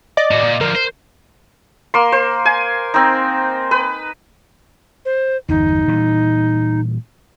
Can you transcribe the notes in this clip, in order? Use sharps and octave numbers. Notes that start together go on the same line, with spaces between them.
D5 D#5 D6
A2 F#4
A#2
D3 F3 A#4
C5
A#3 C6
C5
G#5
C4 D#4
B4
C5
G1 E2 D#4
A#2 E3 G3